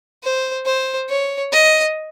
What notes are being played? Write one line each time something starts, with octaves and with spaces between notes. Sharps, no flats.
C5
C5
C#5
D#5